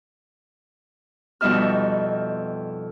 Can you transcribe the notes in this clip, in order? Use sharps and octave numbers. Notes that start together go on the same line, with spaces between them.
F2 B2 G3 D#4 E5 F6